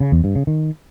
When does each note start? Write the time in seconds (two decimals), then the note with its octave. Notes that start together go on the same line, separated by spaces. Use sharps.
0.01 C#3
0.12 E2
0.24 G2
0.36 C#3
0.47 D#3